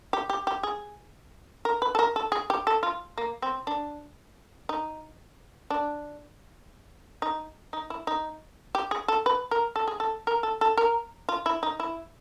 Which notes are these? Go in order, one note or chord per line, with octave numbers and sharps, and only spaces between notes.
G4
G4
G4
G#4
A#4
B4
A4
A#4
A4
G#4
G4
A4
F4
A#3
C4
D4
D#4
D4
D#4
D#4
E4
D#4
G4
G#4
A4
B4
A#4
A4
G#4
A4
A#4
A4
A4
A#4
F4
E4
D#4
E4